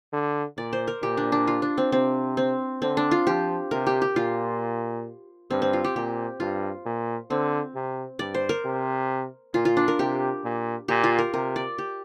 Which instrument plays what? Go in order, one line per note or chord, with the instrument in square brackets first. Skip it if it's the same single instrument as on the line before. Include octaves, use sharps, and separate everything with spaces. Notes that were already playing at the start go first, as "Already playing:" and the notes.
[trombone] D3
[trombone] A#2 [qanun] D5
[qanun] C5
A#4
[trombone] A#2 [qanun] G4
[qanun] D4
D4
F4
D4
C4
[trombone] C3 [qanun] C4
[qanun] C4
[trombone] D3 [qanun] C4
[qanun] D4
F4
[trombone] F3 [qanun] G4
[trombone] C3 [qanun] A#4
[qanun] G4
G4
[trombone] A#2 [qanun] F4
[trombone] G2 [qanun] C4
[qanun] C4
F4
G4
[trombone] A#2 [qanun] G4
[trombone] G2 [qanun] F4
[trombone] A#2
[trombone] D3 [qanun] C4
[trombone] C3
[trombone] G2 [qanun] D5
[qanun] C5
A#4
[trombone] C3
[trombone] A#2 [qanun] F4
[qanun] F4
D4
A#4
[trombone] C3 [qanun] G4
[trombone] A#2
[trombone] A#2 [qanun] G4
[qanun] F4
A#4
[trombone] C3 [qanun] A#4
[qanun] D5
G4